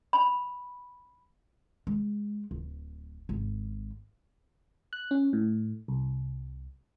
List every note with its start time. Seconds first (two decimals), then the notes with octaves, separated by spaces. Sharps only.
0.13 B5
1.87 G#3
2.51 D1
3.29 G#1
4.93 F#6
5.11 C#4
5.33 A2
5.88 C2